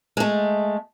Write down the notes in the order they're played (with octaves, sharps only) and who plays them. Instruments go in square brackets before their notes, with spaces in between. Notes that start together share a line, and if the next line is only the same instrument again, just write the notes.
[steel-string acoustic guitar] G#3 A3